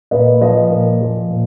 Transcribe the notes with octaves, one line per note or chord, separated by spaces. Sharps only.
A#2 B4 D#5
F3 B4 D#5
A#2
F3
A#2